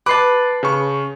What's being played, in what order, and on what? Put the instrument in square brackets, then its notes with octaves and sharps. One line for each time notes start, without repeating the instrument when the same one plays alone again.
[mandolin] B4 A5 [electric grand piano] D6 C7
[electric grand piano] C#3 C#6